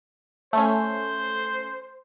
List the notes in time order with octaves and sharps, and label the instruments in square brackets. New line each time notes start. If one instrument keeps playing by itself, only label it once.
[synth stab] A3 C#4 [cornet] C5